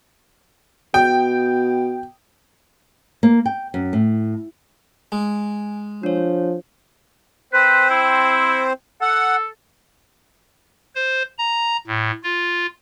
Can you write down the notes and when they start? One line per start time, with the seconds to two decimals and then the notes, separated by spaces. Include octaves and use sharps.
0.94 B2 G5
3.23 A#3
3.46 G5
3.74 F#2
3.93 A2
5.12 G#3 G#5
6.03 F3 D4 C#5
7.53 C4 B4 C5
7.90 E4
9.02 A4 F#5
10.96 C5
11.38 A#5
11.87 A2
12.23 F4